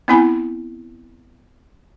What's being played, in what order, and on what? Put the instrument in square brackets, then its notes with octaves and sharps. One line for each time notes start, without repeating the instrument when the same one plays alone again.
[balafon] B3 C4 E4 G#5 B5